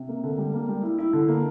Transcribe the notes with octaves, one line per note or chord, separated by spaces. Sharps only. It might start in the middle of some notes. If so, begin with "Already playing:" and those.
Already playing: C3
A#3
D3
G3
A#3
G3
E4
E4
D3
A#3